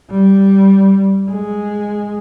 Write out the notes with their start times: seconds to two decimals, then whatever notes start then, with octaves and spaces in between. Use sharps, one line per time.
0.11 G3
1.31 G#3